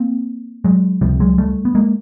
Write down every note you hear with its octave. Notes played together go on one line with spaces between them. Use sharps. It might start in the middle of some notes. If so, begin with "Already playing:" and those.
Already playing: A#3 C4
F#3 G#3
C#2 C3 F3 G3
F#3 G#3
G3 A3
B3
G#3 A#3